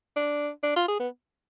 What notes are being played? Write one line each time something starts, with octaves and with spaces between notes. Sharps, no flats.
D4
D4
F4
G#4
B3